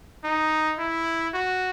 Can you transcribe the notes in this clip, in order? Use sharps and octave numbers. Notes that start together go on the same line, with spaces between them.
D#4
E4
F#4